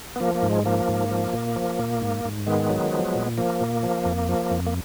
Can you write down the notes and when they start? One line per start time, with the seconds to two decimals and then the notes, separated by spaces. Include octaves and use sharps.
0.16 B3
0.20 F3 A#3
0.35 A#3
0.42 G#2
0.50 G#3
0.66 F3 A#3
0.88 G#2
1.11 F3
1.33 A#2
1.56 F3
1.79 A#2
2.01 G#2
2.25 G#2
2.46 D#3 G#3 B3
2.70 F#3
2.92 F3
3.15 A#2
3.38 F3 A#3
3.61 A#2
3.83 F3
4.05 F2
4.29 F3
4.51 F2
4.66 A#3